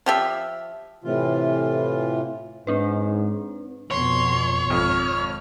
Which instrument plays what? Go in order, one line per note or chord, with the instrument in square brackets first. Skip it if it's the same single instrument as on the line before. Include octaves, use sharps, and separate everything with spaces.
[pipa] F3 G4 E5
[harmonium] A2 C3 E3 F4
[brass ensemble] G#2 [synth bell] C4 D4 B4
[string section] F2 B2 [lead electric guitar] C#5 [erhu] C6
[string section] G#1 [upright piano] F2 [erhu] F6